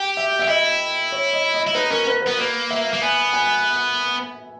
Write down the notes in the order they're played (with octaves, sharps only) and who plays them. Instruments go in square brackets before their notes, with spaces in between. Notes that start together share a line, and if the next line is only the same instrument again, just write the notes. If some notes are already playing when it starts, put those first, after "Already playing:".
Already playing: [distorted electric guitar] G4 [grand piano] G5
[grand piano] E5
E5
[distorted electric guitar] G4
[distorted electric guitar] E4 [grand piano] D#5
[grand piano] C#5
D#5
D#5
[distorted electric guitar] E4
[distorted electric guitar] D#4 [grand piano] B4
[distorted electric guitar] C#4 [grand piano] A#4
[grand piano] B4
[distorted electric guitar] B3 [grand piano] B4
[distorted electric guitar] A#3 [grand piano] B4
[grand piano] E5
[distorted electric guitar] A#3
[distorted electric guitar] B3 [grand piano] G#5
[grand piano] G#5